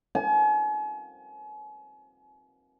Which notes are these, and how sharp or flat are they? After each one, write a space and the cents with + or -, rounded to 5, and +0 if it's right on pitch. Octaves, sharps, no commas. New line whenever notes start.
G#5 +40